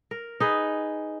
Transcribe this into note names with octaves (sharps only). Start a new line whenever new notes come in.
A#4
D#4 G#4 B4